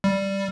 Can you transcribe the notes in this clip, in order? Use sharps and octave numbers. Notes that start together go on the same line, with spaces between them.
G3